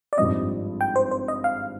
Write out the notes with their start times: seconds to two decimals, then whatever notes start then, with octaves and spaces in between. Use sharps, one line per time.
0.13 D5
0.17 G#1 G2 F3 C4 D#5
0.81 G5
0.96 C5
1.11 C5
1.28 D#5
1.44 F5